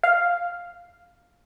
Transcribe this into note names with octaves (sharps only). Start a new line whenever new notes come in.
F5